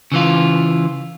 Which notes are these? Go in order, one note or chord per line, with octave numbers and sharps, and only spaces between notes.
C#3 E3 F4